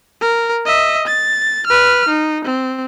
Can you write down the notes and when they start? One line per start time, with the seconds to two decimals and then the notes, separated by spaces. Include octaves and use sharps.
0.21 A#4
0.65 D#5 E5
1.08 A6
1.67 B4 F6
2.08 D#4
2.44 C4